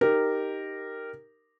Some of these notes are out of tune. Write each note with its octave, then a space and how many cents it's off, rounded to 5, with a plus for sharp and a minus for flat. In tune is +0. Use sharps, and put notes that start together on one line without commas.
D#4 -5 G4 +0 A#4 -10